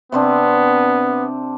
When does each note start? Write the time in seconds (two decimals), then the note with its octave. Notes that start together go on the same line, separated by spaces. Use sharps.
0.12 C3 B3 C4 D4